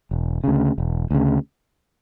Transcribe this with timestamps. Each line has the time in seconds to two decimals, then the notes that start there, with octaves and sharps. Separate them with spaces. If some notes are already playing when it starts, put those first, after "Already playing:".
0.11 E1
0.44 D2 C#3
0.78 E1
1.11 D2 C#3